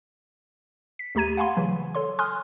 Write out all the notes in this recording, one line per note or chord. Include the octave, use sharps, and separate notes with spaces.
B6
D#2 A3 G4 A#5 G#6 D#7
F5 F#5 G#5 B5 C6
C#3 E3 F#3
A4 C#5 C6
G#5 C6 D#6 F6 F#6